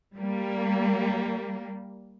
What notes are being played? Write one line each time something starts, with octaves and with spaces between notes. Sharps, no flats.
G3 A#3